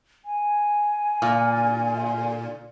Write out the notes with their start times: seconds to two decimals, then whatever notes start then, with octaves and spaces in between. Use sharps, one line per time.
0.25 G#5
1.22 A#2